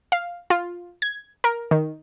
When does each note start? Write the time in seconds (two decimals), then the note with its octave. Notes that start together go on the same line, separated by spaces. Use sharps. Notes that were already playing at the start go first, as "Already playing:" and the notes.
0.12 F5
0.50 F4
1.02 G#6
1.44 A#4
1.71 D#3